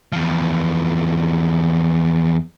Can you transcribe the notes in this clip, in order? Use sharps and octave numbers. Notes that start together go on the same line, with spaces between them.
E2 F3